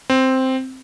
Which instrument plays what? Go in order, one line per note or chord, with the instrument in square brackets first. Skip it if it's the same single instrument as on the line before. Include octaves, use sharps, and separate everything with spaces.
[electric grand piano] C4